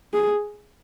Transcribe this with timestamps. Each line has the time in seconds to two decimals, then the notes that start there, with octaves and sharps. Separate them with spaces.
0.14 G#4